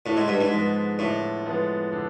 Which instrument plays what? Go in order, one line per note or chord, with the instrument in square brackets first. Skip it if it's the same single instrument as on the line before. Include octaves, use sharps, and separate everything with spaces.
[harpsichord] A2 [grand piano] D3
[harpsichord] G#2
G2
G#2
[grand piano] F3 G#3 B3
[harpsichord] A2 [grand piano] D3
[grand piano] F3 G#3 B3
D3